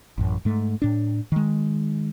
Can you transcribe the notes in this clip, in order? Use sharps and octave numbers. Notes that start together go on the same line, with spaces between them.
A1 F#2
G#2 A3
A2 D4
D#3 G#3